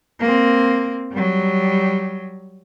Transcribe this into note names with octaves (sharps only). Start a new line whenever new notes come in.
A#3 C4
F#3 G3